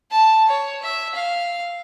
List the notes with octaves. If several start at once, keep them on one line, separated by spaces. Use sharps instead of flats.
A5
C#5
E5
F5